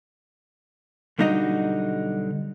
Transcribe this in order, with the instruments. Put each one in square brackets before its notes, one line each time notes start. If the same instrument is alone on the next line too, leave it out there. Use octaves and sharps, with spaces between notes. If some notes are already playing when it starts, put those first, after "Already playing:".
[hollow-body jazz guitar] B1 D3 G3 D#4 F#4 D#5